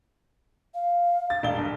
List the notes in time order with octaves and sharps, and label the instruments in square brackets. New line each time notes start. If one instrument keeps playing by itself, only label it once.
[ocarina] F5
[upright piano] A6
E1 G7
G1